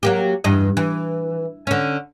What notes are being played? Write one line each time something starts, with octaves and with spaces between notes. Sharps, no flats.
F#3 A#3 G4
E2 G2 D#5
E3
D3 C#4